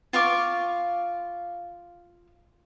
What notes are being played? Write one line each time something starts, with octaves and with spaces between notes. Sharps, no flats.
F4 F5 C#6 D6